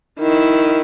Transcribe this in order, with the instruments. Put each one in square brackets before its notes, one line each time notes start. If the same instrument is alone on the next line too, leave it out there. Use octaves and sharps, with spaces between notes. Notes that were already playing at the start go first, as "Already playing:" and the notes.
[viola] D#3 E4